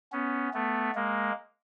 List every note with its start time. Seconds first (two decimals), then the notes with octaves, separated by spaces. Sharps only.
0.12 B3 C#4
0.53 A3 B3
0.95 G#3 A#3